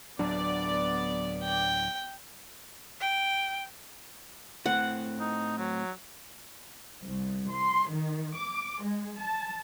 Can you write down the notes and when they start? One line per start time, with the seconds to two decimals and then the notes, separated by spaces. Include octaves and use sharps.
0.19 D1 F#3 B3 D4 D5
1.43 G5
3.01 G5
4.66 A2 C4 F#5
5.20 D#4
5.58 F#3
7.04 C2
7.50 C6
7.89 D#3
8.36 D6
8.83 G#3
9.20 A5